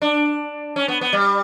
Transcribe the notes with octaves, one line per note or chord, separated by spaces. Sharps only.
D4
C#4
B3
B3
G3